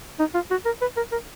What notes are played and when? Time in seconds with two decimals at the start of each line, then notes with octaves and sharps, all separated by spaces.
0.19 D#4
0.35 F4
0.51 F#4
0.65 A#4
0.81 B4
0.97 A#4
1.12 A#4